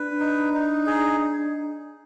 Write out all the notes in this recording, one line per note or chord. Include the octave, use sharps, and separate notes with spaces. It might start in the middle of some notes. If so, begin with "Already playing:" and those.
Already playing: D4 B4
D#4
D#4
G#4